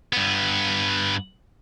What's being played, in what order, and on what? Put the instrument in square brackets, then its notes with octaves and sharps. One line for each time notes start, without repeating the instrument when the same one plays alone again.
[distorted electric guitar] G2 B3